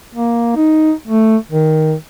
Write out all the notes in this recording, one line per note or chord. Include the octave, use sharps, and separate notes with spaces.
A#3
D#4
A3
D#3